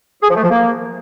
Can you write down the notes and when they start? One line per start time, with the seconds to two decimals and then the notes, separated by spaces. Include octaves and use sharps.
0.23 G#4
0.30 F3
0.37 A3
0.44 F3
0.51 A#3